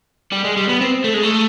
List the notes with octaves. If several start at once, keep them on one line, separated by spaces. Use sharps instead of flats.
G3
G#3
G3
B3
C4
A3
G#3
A3